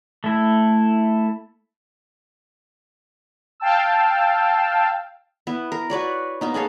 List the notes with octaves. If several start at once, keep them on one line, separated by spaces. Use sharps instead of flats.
A3 E4
F5 G5 A5 E6
B3 E4
A#4
F#4 B4 C#5 D5
A#3 B3 D#4
C#4 G#4 A4 F5